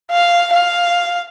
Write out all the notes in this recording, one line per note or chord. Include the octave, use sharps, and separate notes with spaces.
F5
F5